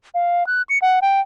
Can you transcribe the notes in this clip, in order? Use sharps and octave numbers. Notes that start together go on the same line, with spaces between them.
F5
F#6
C#7
F#5
G5